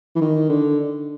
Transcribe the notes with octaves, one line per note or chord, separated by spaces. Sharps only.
E3
D#3
D3